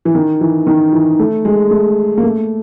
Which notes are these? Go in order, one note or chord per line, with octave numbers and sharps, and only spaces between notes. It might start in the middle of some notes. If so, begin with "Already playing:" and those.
E3
D#3
E3
D#3
E3
A3
G#3
A3
A#3
A3